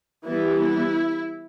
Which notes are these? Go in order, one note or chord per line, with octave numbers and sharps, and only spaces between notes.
E3 G3 B3 E4
E4